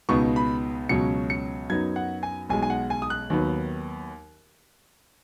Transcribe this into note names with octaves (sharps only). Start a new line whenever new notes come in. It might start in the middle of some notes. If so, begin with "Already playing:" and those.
C#2 B2 B3 D#4 C#6
B5
C#2 B2 F#3 C#4 C#7
C#7
F#2 F#3 B3 D#4 G#6
F#5
G#5
B1 B2 G#3 G#5
G#5
F#5
G#5
D#6
F#6
D#2 D#3 F#3 B3